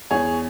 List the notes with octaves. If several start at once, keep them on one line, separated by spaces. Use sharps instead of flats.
E2 E3 G#4 C#5